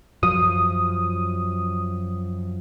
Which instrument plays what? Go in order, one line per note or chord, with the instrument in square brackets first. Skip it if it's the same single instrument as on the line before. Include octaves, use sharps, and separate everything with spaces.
[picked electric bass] F#2 F3 [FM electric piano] D#6